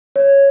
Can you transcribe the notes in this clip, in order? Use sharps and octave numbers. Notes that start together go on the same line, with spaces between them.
C#5